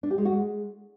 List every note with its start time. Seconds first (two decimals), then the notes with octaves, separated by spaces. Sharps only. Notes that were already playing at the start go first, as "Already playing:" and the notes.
0.03 D4
0.11 G4
0.18 G#3
0.25 F#4
0.33 G#3